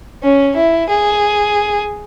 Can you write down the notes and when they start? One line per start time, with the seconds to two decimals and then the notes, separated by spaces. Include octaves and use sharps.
0.23 C#4
0.56 E4
0.89 G#4